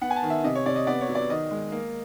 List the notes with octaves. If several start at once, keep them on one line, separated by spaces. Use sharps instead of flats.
B3 F#5
G#5
A5
D#3
E5
C3 D#5
C#5
C3 D5
D#5
B3 D5
C#5
F#3
D5
D#3 D#5
G#3
A#3